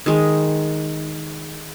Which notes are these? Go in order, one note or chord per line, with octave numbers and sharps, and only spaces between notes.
D#3 G#3